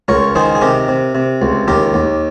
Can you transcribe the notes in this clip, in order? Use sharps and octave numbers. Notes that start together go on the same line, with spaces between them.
C#2 A#4 C#5
D#3 G#4 C5
G#4
C3 G4 A#4
C3
C3
C#2
D#2 G4 A#4
D#2